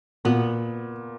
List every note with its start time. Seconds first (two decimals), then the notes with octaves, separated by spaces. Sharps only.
0.25 A#2 B3